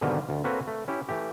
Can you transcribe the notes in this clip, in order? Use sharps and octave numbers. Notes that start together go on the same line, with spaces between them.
G#2 B2 D3 D#3 G3 A#3
D2
A#3 C4 F#4 A4 B4 C#5
A3
C#4 E4 G4
E3 A3 G4